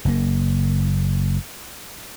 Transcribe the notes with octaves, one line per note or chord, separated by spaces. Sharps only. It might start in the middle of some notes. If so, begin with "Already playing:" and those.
F#1 A#3